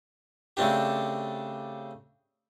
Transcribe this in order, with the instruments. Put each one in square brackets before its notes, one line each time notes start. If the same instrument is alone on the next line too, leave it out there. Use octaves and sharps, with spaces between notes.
[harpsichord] C#3 A3 C4 D4 G4